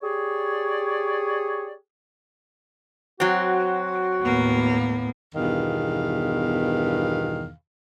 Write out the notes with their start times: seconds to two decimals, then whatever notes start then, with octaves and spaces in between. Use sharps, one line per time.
0.02 G4 G#4 C#5 D5
3.20 F#3 C4 F#4
4.23 D#2 A2 A#3 B3
5.35 E2 G2 B2 D#3 F5